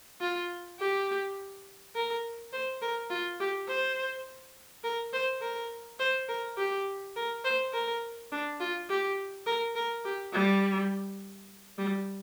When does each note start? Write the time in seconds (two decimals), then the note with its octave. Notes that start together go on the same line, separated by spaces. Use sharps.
0.21 F4
0.79 G4
1.95 A#4
2.53 C5
2.82 A#4
3.10 F4
3.40 G4
3.68 C5
4.84 A#4
5.13 C5
5.41 A#4
5.99 C5
6.28 A#4
6.57 G4
7.16 A#4
7.44 C5
7.73 A#4
8.32 D4
8.60 F4
8.90 G4
9.46 A#4
9.75 A#4
10.05 G4
10.33 G3
11.78 G3